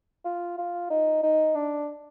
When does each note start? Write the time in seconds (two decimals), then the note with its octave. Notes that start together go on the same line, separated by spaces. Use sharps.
0.25 F4
0.58 F4
0.90 D#4
1.23 D#4
1.55 D4